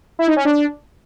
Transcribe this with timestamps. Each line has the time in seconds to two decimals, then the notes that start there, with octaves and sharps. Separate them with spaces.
0.19 E4
0.28 D#4
0.36 C#4
0.45 D4